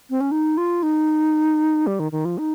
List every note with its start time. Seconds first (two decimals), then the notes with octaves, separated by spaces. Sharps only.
0.10 C4
0.21 C#4
0.31 D#4
0.57 F4
0.83 D#4
1.87 G3
2.00 D#3
2.12 D#3
2.25 F3
2.38 D#4